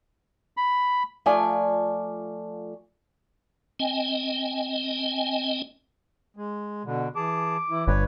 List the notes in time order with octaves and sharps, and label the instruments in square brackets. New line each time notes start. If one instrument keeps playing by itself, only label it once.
[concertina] B5
[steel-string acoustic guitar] F3 A3 F4 D5 G#5
[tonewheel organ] C4 D#5 G5 G#5
[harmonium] G#3
B2 D3
[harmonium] E3 G#4 A5 [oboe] D6
[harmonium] E3 E4
[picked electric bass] G1 G2 [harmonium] B4 C#5